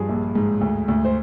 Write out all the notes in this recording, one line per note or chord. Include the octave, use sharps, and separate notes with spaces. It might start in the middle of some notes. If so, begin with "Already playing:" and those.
Already playing: G2 F3 G#4
A#1
G#2
D2
D2
C5